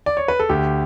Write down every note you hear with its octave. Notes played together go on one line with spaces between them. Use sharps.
D5
C#5
B4
A4
D2 G4